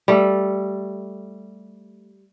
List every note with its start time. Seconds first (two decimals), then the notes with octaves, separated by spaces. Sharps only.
0.08 G3 A3